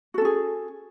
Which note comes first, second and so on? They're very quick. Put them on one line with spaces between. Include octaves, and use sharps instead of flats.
F#4 A4 C#4 G#4